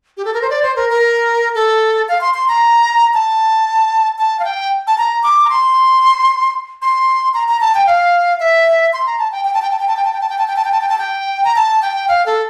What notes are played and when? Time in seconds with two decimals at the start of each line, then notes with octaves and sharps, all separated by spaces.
0.17 G4
0.25 A4
0.34 A#4
0.42 C5
0.50 D5
0.63 C5
0.76 A#4
0.90 A#4
1.55 A4
2.09 F5
2.21 C6
2.34 C6
2.48 A#5
3.14 A5
4.18 A5
4.40 F5
4.44 G5
4.87 A5
4.98 A#5
5.23 D6
5.45 A#5
5.50 C6
6.82 C6
7.34 A#5
7.48 A#5
7.61 A5
7.75 G5
7.87 F5
8.40 E5
8.93 C6
9.06 A#5
9.19 A5
9.32 G5
9.45 G5
9.54 A5
9.62 G5
9.71 A5
9.79 G5
9.88 A5
9.97 G5
10.05 A5
10.13 G5
10.21 A5
10.29 G5
10.38 A5
10.48 G5
10.56 A5
10.65 G5
10.72 A5
10.81 G5
10.89 A5
10.98 G5
11.44 A#5
11.56 A5
11.82 G5
12.08 F5
12.26 A4